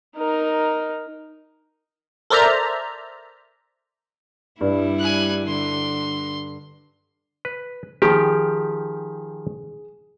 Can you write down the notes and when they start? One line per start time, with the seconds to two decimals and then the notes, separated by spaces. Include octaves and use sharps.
0.17 D#4 A#4
2.30 A4 A#4 C5 D5 E5 A#5
4.61 G2 G3 E4
4.99 G#5 F#6
5.48 D3 C6
7.45 B4
8.02 D#3 F3 G4 G#4